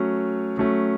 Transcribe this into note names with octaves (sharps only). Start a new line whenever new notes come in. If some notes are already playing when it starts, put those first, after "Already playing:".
Already playing: F#3 A3 C#4
F#3 A3 C#4